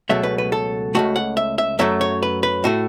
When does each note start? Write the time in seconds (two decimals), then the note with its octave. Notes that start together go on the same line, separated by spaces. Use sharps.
0.09 C#2 B2 F#3 A3 E5
0.23 B4
0.38 B4
0.52 A4
0.95 C#2 C#3 A3 F#4
1.16 F#5
1.37 E5
1.58 E5
1.79 F#2 F#3 A3 E5
2.01 C#5
2.23 B4
2.43 B4
2.64 A2 A3 F#4